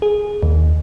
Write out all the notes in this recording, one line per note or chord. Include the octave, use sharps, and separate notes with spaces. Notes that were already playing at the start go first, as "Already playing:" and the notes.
G#4
D#2